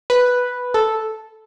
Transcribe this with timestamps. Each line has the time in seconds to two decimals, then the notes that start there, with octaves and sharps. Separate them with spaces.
0.10 B4
0.74 A4